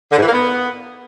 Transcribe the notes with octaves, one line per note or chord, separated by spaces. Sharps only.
D3
G#2
E3
A#3
B3